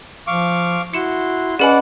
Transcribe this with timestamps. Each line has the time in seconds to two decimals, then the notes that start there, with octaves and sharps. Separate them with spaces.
0.27 F3 F5 C#6 D6
0.94 E4 F#4 C6 C#7 E7
1.59 C#4 G#4 B4 D5 D#5 F#5 G#5 B5